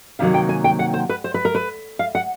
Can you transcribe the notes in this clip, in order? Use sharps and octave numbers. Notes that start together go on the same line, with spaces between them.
C3 D#3 F#3 A#3 F5
G5
G#5
G5
F#5
C5
B4
C5
B4
A#4
B4
F5
F#5